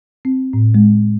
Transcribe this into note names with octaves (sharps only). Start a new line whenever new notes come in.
C4
A2
G#3